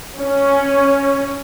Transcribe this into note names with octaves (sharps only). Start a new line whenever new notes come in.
C#4